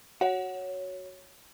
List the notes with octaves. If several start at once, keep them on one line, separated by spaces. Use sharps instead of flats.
F#4 C#5 F#5